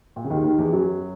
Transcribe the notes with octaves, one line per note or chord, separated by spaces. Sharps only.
A#2
C#3
D#2 D#3
D#2 D#3
E2 E3
F#2 F#3